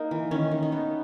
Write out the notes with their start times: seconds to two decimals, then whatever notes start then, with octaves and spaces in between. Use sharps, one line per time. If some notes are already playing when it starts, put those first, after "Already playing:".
Already playing: A#3 D#4
0.11 E3
0.31 D#3 C#4
0.51 D#3
0.63 D#4
0.72 B3